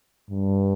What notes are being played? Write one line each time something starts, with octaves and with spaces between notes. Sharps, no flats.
G2